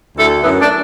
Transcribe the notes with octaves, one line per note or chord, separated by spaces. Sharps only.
D2 E4 A4
F#2 B3 E4
A3 D4